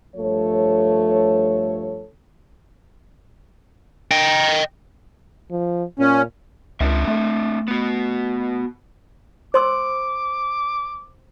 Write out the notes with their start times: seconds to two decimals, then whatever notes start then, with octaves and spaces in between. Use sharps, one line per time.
0.16 G2 F3 A3 A4 C#5
4.11 D#5 G5
5.51 F3
5.99 A#2 C#4
6.80 C#2 C4 D4 E5
7.07 A3
7.68 B3 F#4
9.54 C5 C6 D6 E6